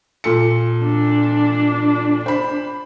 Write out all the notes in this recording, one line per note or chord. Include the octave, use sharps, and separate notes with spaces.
A#2 A4 C#7
D4
C5 B5